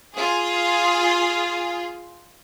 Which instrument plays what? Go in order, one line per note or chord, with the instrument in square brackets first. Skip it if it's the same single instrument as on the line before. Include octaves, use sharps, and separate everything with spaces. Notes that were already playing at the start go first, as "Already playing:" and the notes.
[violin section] F4 G#4